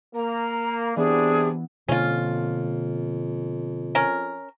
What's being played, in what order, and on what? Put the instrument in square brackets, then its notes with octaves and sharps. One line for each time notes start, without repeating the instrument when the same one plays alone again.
[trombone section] A#3 [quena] A#5
[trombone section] C3 D4 [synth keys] E3 B3 [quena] G#4
[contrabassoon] F2 [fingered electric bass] B2 D3 A#3 [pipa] C#4 F4
[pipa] C#4 A#4